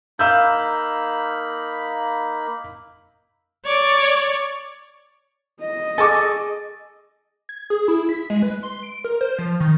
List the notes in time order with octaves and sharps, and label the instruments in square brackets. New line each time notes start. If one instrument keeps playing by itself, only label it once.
[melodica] A#3 D#4 B5 [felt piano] F5 E6 G6
[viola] C#5 D5
[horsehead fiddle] D#5
[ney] G#4 [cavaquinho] A4 C#6 [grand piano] G#5 D6
[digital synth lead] G#6
G#4
E4
B6
G#3
B4
C6
D7
A#4
C5
F3
D#3